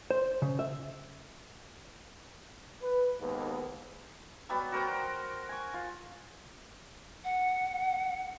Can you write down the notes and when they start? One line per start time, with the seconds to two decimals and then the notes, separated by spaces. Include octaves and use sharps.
0.11 C5
0.42 C#3
0.59 E5
2.83 B4
3.20 D#2 G#2 A#3 B3
4.49 F#3 G3 B3 B5
4.72 F#4 A#4 C5 G5
5.49 G#5 C#6
5.74 F4
7.24 F#5